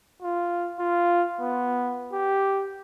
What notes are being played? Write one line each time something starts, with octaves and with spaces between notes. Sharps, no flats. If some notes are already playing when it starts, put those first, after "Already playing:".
F4
F4
B3
G4